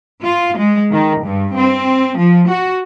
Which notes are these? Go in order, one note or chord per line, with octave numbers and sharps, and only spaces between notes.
F4
G#3
D#3
G2
C4
F3
F#4